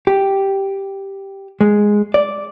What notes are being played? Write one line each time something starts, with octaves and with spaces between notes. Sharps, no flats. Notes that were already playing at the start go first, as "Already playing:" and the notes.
G4
G#3
D5